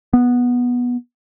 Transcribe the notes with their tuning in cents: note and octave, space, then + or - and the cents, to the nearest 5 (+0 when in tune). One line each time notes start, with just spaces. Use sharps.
B3 -10